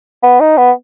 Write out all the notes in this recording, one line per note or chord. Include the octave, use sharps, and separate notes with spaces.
B3
D#4
B3